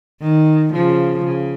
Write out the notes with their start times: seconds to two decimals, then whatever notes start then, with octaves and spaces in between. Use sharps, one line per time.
0.21 D#3
0.72 C#3 F3
1.24 C#3